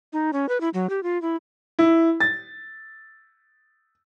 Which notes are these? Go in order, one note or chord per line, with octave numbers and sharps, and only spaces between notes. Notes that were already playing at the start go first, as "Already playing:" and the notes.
D#4
C#4
B4
E4
F#3
G4
F4
E4
E4
A6